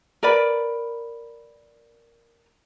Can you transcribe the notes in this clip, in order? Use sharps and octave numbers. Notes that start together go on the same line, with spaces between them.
A#4 B4 D5 B5